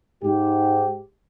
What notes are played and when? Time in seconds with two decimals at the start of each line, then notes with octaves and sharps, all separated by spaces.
0.23 G#2 G4